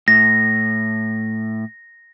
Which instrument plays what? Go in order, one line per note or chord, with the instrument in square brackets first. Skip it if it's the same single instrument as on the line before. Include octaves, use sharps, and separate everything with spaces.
[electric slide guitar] A2 [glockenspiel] A#6